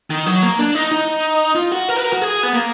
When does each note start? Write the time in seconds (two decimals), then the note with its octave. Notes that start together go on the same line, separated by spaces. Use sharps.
0.10 D#3
0.26 F#3
0.43 A#3
0.59 D4
0.75 D#4
0.92 D#4
1.56 F4
1.72 F#4
1.89 A#4
1.96 B4
2.04 A#4
2.13 F#4
2.22 G#4
2.43 B3
2.53 A#3